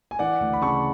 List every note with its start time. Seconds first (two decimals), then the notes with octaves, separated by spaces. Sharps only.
0.11 G#5
0.19 E3 D5 F#5
0.41 D2
0.53 B5
0.62 C#3 A5 C#6